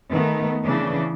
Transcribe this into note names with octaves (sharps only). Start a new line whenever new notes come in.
D#3 A3 B3
C#3 E3 D4